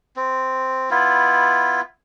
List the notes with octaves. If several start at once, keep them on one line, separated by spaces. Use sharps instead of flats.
C4
B3 E4 F4